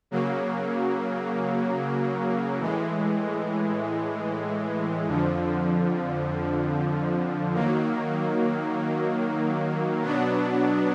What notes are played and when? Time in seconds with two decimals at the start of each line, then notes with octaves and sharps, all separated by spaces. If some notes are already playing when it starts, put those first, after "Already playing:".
0.11 C#3 F#3 A#3
2.58 A2 E3 G#3
5.06 F2 D3 F3
7.54 D#3 F#3 A#3
10.02 B2 F#3 B3 D4